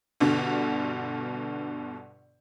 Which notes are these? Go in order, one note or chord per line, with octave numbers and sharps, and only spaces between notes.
G1 G2 B2 D3